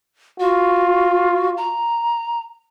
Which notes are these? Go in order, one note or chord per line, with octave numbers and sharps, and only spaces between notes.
F4 F#4
A#5